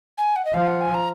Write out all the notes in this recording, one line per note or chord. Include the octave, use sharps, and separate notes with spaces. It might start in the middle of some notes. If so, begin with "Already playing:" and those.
G#5
F#5
D#5
F3 F5
F#5
G#5
A#5